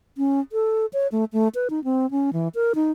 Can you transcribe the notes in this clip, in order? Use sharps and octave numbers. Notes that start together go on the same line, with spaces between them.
C#4
A4
C#5
A3
A3
B4
D#4
C4
C#4
E3
A#4
D#4